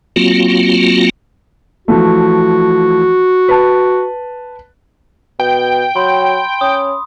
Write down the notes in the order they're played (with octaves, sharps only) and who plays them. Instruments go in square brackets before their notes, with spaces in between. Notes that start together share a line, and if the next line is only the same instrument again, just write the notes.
[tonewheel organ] F#3 A#3 C4 F4 F#4
[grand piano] E3 F3 A3 [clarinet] F#4
[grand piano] B4 A5
[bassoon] B2 [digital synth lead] G5
[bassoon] F#3 [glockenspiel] B5 C6
[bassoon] C#4 [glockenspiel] D#6